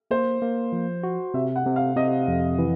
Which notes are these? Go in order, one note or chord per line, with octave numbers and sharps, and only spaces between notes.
A#3 C5
A#3
F3
F#4
C3 E5
F#5
C3
F5
C3 D#5
F2
E3